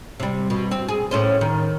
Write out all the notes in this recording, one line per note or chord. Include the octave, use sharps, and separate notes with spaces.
C3 G3
B2
C4
G#4
A2 C#4 C5
D#3